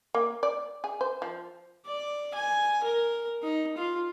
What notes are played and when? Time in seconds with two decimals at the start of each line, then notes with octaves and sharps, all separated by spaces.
0.14 A#3
0.43 D5
0.84 G#4
1.01 C5
1.22 F3
1.86 D5
2.34 G#5
2.84 A#4
3.42 D#4
3.77 F4